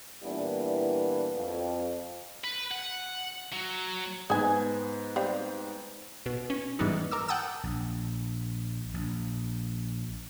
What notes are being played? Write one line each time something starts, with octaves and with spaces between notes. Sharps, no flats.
A#2 E3 G3 B3 D4 E4
F2
B4
F#5
F#3
G#2 B3 G#4 G#5
G3 C4 F5
B2
C#4
G#2 E3 G3 B3 D#4
A#4 D6 E6
F#5 G5 A5 D#6 E6
A#1
A#1